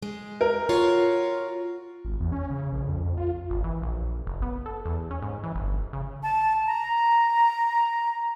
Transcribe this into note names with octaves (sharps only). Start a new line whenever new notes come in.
G#3
A#4
F4 F#4 C#5
G#1
E2
C#4
C#3
A#1
F2
F2
F4
G#1
E3
A#1
F#1
B3
A4
E2
C#4
G#2
E3
G1
C#3
A5
A#5